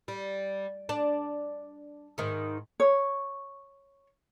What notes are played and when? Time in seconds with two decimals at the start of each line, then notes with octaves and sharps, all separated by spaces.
0.08 G3
0.89 D4
2.18 G#2 D#3
2.80 C#5